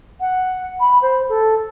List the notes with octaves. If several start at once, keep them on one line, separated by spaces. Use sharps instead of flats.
F#5
B5
C5
A4